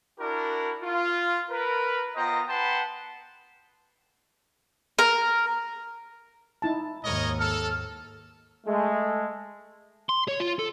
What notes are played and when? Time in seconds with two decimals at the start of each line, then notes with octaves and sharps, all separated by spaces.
0.18 D4 E4 F#4 A#4
0.82 F4
1.50 A#4 B4
2.16 B3 F4 C5 D#5 G5 A#5
2.48 B4 F#5 G5 A5 B5 C6
4.99 A#4
6.62 D#4 E4 A5
7.03 D#2 G#2 A#4 C#5 D#5
7.39 A4 F6
8.67 G#3 A3
10.09 C6
10.28 C#5
10.40 F4
10.59 A4